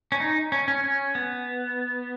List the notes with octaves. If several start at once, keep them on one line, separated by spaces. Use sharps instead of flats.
C#4
D#4
C#4
C#4
C#4
B3